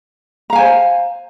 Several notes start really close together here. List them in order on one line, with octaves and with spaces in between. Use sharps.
A#5 F5 G#5 C5